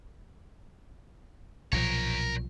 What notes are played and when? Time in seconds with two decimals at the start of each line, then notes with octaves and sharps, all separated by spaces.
1.72 B1 A#2 F3 A#4 C#5